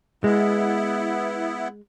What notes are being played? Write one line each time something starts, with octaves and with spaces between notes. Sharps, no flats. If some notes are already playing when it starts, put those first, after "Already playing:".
G#3 B3 E4